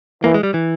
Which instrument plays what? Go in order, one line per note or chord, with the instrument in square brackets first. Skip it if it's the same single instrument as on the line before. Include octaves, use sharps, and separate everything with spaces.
[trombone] E3 [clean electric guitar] A#3
[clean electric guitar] G#3
G3
E3